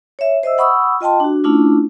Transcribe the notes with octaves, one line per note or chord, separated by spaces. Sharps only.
C#5 E5
C5 D#5 E5 E6
F#5 B5 C#6 D#6 E6
F4 D#5 G5 A5 C6
D4 F#4
A3 C#4 D4 E4 F4